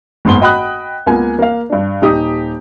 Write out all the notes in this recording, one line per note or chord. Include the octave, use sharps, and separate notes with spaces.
F#1 G#2 B3 C6 G7
F#4 D#5 G5 B5 D#6 F#6
C#2 A#3 B3 G#5
A#3 F5
G2 D4
D#1 D#4 G4 D#6